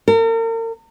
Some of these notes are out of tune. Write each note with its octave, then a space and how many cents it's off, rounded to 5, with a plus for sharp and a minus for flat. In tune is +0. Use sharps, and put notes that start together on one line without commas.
A#4 -40